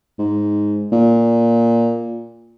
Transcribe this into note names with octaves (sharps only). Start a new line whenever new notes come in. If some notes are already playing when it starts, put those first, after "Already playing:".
G#2
A#2